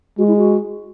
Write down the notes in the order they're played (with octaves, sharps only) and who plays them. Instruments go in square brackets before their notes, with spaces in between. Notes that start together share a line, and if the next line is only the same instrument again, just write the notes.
[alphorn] G#3 [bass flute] F#4
[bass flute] E4
F#4